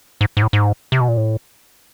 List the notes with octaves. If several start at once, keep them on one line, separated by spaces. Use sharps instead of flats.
G#2
G#2
A2
G#2
C3
B2
A#2
A2